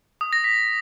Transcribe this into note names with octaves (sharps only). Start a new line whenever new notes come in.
D#6
A#6
B6